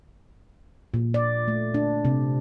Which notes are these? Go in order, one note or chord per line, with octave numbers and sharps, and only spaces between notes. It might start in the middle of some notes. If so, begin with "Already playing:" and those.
A#2
D5
A3
D4
C3